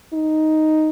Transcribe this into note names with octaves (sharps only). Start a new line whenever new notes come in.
D#4